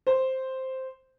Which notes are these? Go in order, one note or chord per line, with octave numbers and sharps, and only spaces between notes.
C5